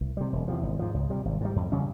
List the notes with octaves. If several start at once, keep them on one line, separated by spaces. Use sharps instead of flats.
C2
C3 G3
E1
E2 C3 F3
G#1
G#2 F3
C#2
C3 G3
G#1
G#2 G3
F2
C#3 G3 C#4